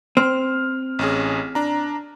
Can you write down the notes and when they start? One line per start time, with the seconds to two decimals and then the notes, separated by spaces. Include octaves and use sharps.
0.17 C4 F6
0.99 A1 C#4 G#4
1.55 D4 A#5